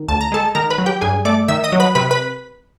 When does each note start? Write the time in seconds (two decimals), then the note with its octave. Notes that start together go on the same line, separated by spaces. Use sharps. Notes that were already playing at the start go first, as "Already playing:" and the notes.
Already playing: D#3
0.08 D2 A5
0.21 A#5
0.32 G#3 A4 A5
0.55 D#3 A#4 A#5
0.70 B4 B5
0.78 F#3
0.86 G4 G5
1.01 G2 G#4 G#5
1.25 A3 D5 D6
1.48 D#3 E5 E6
1.64 D#5 D#6
1.72 F#3
1.80 B4 B5
1.95 C3 B4 B5
2.11 B4 B5